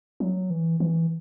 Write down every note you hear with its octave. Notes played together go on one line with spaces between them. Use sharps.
F#3
E3
E3